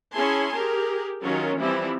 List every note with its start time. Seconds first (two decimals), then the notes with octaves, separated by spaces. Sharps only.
0.12 C#4 E4 G#4 G#5 A5 C6
0.55 G4 G#4 A#4
1.22 D#3 F#3 C#4 F4 A#4
1.60 E3 F3 G3 C4 E4